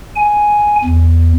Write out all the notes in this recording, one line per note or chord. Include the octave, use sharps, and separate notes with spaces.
G#5
E2